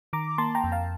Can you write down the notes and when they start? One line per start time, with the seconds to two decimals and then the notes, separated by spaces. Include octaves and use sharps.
0.13 D#3 A#5 D6
0.38 A#3 A5 C6
0.55 G5 A#5
0.64 F2
0.72 F5 A5